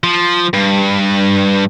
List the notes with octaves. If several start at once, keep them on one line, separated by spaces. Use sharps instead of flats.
F3
G2